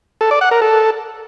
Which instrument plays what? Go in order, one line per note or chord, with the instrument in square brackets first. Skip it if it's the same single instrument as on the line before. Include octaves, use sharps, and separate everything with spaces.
[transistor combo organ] A4
D5
F#5
A#4
A4